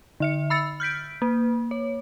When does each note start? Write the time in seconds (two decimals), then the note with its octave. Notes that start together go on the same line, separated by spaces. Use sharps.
0.20 D3 E5 C#7
0.50 B5 E6 A6 C#7
0.80 F6 G6 B6 D7
1.22 A#3
1.71 C#5